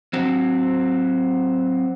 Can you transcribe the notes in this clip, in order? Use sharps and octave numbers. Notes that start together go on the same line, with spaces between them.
F#3 C4